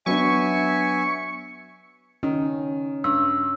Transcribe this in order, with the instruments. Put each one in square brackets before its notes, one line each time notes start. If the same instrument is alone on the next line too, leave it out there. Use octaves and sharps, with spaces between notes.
[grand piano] F#3 B3 D4 [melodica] E5 G#5 [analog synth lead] C#6
[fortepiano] D#3 [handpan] C#4
[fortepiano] G2 [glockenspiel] E6